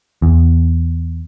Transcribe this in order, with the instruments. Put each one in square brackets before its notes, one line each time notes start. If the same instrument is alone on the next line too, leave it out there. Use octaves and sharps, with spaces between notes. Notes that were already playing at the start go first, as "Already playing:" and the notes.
[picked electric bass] E2